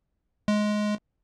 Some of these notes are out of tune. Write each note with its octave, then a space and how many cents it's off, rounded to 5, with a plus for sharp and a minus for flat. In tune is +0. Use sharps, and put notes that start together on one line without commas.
G#3 +15